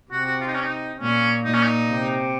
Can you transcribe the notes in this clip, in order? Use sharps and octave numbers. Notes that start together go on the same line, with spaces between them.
C3 F#4
F#4
F4
D#4
C#4
D#4
A#2 C#4
A#2 D#4
C#4
D#4
C3